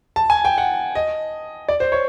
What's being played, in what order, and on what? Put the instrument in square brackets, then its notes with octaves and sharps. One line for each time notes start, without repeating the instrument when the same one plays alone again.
[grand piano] A5
G#5
G5
F#5
D#5
D5
C5
C#5